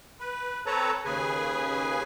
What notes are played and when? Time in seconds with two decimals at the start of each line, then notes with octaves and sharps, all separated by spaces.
0.20 B4
0.66 C4 A4 B4 C#5 A5 A#5
1.05 D#2 C#3 G#4 B4 G#5